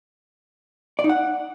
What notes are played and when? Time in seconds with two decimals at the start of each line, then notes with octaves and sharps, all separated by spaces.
0.99 D5
1.04 D#4
1.09 F#5